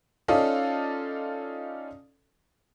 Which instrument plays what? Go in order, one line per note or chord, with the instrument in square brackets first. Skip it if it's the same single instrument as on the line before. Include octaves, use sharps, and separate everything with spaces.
[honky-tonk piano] C#4 D#4 F4 A4 D5 D#5